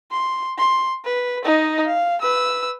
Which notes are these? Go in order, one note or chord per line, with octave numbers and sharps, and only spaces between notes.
C6
C6
B4
D#4 D#5
F5
B4 E6